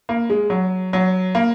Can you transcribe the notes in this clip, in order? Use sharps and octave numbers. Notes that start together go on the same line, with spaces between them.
A#3
G#3
F#3
F#3
A#3